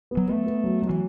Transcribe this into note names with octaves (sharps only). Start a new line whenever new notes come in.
B3
F#3
A3 B3
B3
F#3
F#3
E3